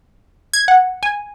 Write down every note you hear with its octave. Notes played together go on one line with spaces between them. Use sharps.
G#6
F#5
G#5